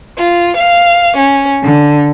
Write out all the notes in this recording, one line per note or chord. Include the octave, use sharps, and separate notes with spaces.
F4
F5
C#4
D3